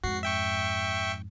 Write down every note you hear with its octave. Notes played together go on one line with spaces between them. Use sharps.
F2 G#2 F#4 C7
E5 G5 C#6